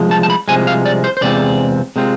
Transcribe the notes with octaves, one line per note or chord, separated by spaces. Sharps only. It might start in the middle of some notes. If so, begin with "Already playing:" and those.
Already playing: C2 F3 G#3
A5
A5
B5
C2 C3 F3 G#3 G#5
F5
D5
C5
C5
E2 C3 G#3 C4 F4 D5
C3 G#3 C4 F4